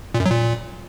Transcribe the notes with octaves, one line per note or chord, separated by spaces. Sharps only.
A#2
F#2
F#3
A#2